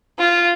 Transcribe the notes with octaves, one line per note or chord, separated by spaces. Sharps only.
F4